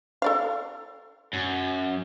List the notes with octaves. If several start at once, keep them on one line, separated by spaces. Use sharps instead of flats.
A4 D5 F5
F#2